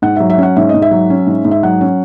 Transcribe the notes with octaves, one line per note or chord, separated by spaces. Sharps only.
G#2 F#5
F#3 E5
E5
C#4 F#5
G#2 E5
D#5
G#2
E5
F#3
C#4
G#2
G#2
E5
F#3 F#5
C#4